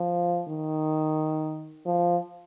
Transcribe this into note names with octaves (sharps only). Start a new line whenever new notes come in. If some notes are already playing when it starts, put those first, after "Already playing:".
Already playing: F3
D#3
F3